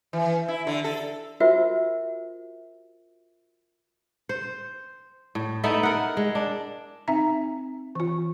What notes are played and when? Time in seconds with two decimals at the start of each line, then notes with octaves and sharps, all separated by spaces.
0.13 E3
0.48 E4
0.67 D3
0.84 A4
1.40 F4 F#4 A#4 C5 E5
4.29 C5
5.35 A2
5.64 A3 B3 D#4 E4
5.83 A#4 F#5
6.17 G#3
6.35 D4
7.08 C4 D#4 E5 A#5
7.95 E3 F4